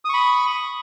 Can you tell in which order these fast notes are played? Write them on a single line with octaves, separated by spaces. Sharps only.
D#6 C#6 B5